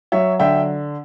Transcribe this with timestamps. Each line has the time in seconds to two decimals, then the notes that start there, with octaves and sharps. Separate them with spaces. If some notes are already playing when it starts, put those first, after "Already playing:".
0.12 F#3 C#5 E5
0.40 D3 E5 G5